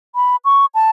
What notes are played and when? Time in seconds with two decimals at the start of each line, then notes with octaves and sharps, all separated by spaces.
0.15 B5
0.45 C#6
0.75 A5